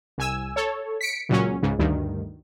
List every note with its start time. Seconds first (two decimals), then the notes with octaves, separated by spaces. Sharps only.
0.18 C2 G#5 E6
0.56 A4 C#5
1.01 B6 C#7 D7
1.29 C#2 A#2 F#3 C#4
1.62 C#2 G#2 C#3
1.79 D2 G2 D#3